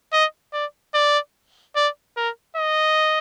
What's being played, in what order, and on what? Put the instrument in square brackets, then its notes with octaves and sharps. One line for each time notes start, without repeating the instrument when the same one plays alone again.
[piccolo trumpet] D#5
D5
D5
D5
A#4
D#5